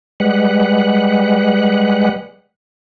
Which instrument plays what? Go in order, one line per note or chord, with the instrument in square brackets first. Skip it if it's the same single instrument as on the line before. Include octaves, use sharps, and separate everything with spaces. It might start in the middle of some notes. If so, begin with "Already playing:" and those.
[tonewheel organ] G3 G#3 B4 F#5